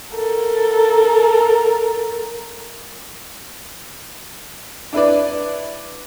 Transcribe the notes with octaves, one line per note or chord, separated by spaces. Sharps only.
A4 A#4
D4 E4 B4 D5